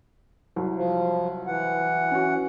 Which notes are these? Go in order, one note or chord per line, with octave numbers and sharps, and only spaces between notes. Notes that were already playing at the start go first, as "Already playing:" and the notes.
C2 F#3
F3
E3 F#5
C#4 F#4